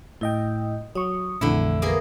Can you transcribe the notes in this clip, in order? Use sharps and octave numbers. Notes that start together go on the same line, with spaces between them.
A2 E4 D#5 G5
F#3 C#6 D#6
A#1 F2 D3 E3 A3 E4
A#3 G#4 A#4 B4 D#6